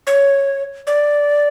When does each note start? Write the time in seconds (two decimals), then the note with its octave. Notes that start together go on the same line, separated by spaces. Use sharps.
0.07 C#5
0.87 D5